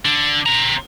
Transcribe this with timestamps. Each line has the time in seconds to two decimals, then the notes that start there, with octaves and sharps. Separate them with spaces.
0.05 D3
0.46 C4 A#5